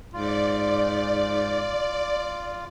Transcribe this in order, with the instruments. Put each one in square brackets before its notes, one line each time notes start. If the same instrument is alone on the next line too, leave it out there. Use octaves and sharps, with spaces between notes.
[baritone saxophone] G#2 [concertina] F4 [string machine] D5